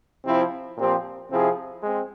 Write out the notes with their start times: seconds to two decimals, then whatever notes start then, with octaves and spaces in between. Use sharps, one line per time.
0.24 C3 F3 C4 E4
0.77 A#2 F3 C4 G4
1.30 C3 F3 C4 E4 G#4
1.83 G#3 C4